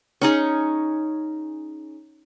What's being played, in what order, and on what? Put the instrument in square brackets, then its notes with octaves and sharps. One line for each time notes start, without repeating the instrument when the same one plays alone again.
[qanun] C#4 D#4 G#4